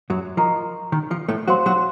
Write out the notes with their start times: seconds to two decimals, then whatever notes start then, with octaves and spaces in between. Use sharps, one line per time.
0.10 F#2 F#3
0.37 F3 A#4 D#5 A#5 C#6
0.92 D#3
1.11 F3
1.28 A2 A3
1.48 F#3 F#4 C5 F5 C6
1.66 F#3 F#4